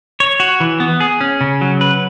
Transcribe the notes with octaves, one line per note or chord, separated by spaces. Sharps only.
C#5
F#4
E3
B3
G#4
C#4
C#3
F#3
B4